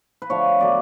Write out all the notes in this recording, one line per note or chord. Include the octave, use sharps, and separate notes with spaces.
B4
D3 F3 A3 C#5
D3 F#3 B3 D5